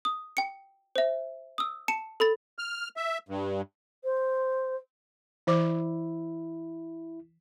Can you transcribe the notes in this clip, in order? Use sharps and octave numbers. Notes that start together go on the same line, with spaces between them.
D#6
G5 C#7
C5 E5
D#6 E6
A5 C#7 E7
A4 B5 A6
F6
E5
G2
C5
E3 E4 C5 D6